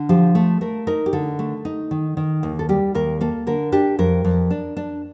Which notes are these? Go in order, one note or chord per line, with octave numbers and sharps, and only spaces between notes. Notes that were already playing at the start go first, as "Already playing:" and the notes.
Already playing: D3
F3 G4
A3 A4
A3 A#4
D#4 A#4
G4
D3 A4
A3
D#4
D#3
D#3
D#2
A4
G3 G4
D#2 A#4
A#3 A4
D3 A#4
D4 G4
F2 A#4
F2
D4
D4